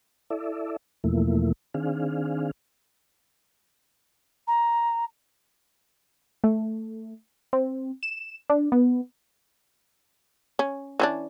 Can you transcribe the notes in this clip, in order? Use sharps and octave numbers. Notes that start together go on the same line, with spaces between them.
E4 A4 D5 E5
E2 B2 F3 A3 A#3 E4
D#3 C4 D4 G#4 F5
A#5
A3
C4
E7
D4
B3
C#4
E3 C#4 D4